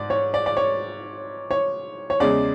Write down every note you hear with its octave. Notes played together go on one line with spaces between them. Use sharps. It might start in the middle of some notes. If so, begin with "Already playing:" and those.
Already playing: G#2 D5
C#5
D5
D5
C#5
C#5
C#5
E2 C#3 G#3 D5